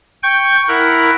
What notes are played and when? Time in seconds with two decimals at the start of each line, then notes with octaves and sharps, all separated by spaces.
0.23 G5 C#6 G6
0.68 E4 A#4 F#5